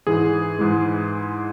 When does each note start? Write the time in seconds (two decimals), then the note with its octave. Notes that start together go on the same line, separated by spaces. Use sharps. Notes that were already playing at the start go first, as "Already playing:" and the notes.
0.07 G#2 E3 G#3 G#4
0.59 G#2 E3 G#3